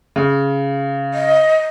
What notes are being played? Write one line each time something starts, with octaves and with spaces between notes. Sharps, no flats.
C#3
D#5